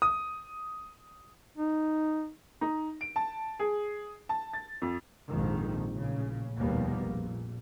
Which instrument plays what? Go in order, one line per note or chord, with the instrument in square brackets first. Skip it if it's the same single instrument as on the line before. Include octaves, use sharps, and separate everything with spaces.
[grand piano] D#6
[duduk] D#4
[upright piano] D#4
D7
A5
G#4
A5
A6
F2
[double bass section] A#1 F2 G#2 D#3
A1 A#2 C#3
F1 D#2 B2 G3 A#3 B3
A#1 A#2